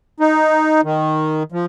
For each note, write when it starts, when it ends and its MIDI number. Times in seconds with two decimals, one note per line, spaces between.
0.20 0.81 63
0.84 1.43 51
1.52 1.66 53